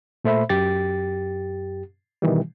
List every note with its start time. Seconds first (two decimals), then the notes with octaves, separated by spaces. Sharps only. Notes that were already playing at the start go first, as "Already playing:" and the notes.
0.24 A#2 A3 C5 E5 B5
0.49 F#2 G4 A6
2.22 B2 D#3 E3 G3